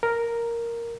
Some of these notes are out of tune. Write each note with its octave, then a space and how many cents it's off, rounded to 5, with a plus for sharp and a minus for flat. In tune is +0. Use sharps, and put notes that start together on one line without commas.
A#4 +0